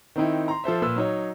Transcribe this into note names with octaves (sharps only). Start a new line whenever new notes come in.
D#3 C4 D#4 E4
A#5 C6
F3 A4 C5 E5
A#2 B4 E6
F#3 D#4 C#5